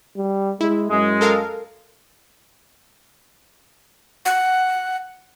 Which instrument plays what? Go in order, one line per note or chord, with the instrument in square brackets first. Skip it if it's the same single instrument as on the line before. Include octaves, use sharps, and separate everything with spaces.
[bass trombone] G3
[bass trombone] G#3 [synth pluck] E4
[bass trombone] F#2 [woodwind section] G#3
[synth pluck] A4 A#4 F5
[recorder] F#5